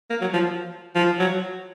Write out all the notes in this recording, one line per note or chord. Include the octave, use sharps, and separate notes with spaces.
A#3
F#3
F3
F3
F#3